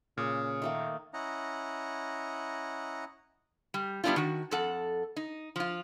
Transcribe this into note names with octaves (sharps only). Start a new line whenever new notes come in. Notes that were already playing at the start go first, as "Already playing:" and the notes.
A#2 C#3 D#6 F6
D#3 A3 A#3
C#4 E4 D#5 F#5 A#5
G3
G3 B3 C4 D4 E4 F4
D#3 F#4
F2 A4 F#5
D#4
F3 F4